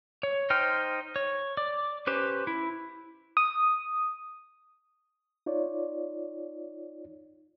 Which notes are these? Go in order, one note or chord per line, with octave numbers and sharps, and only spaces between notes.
C#5
D#4 C5 G5 F6
C#5
D5
C#4 G4 B4 C5
E4
D#6
D#4 F4 C#5 D5